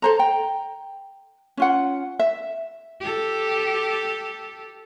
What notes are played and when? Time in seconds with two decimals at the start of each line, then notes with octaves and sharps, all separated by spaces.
0.02 A4 C5 A#5
0.19 G5
1.57 C#4 F4 F#5
2.19 E5
3.00 G4 A4